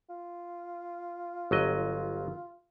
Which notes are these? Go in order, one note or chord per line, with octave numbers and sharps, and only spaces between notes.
F4
G1 F#3 D#5